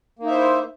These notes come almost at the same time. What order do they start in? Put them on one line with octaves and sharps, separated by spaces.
A#3 D#4 E5 C5 E4